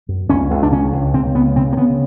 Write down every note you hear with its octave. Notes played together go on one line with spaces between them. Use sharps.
F#2
C#2 C#4
C#2
D4
C#3 C#4
C#2
C#3 C4
C#2 B3
C#3 C4
A#3
C#3 B3